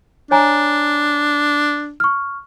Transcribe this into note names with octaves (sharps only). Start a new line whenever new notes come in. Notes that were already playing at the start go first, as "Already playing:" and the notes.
D4 C#5 G#5 A#5
C#6 F6